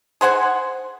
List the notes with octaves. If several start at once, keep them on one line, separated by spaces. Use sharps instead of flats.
G#4 C5 F#5 G#5